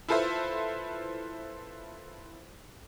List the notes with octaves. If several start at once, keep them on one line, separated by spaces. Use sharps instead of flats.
E4 F4 A4 B4 C5 E5